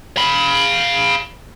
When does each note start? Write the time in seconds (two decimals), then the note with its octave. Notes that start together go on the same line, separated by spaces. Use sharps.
0.17 F5 B5